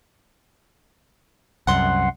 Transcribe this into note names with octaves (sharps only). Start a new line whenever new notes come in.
C2 F#2 F#5 C6